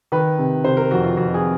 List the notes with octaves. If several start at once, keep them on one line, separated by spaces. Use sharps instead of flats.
D#3 B4
C3
C3 C5
A#4
F2 F#4
F4
F2 F#4
G#4